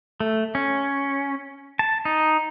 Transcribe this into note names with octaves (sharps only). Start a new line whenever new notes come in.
A3
C#4
A5
D#4